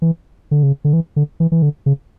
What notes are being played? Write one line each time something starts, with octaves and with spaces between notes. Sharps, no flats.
E3
D3
C#3
D3
E3
D3
E3
E3
D3
C#3